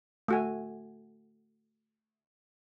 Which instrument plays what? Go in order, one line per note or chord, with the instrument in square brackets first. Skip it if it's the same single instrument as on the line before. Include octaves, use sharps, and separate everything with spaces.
[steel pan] A3 F#4 G#5